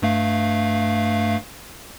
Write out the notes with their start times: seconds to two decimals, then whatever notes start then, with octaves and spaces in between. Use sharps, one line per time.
0.02 G2 A3 F5